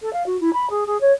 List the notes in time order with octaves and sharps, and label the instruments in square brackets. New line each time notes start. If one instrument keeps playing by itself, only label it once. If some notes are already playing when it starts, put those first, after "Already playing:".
[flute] A4
F5
F#4
E4
B5
G#4
G#4
C#5